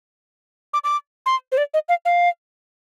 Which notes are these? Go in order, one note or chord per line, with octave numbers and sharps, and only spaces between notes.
D6
D6
C6
C5
D5
D#5
F5
F5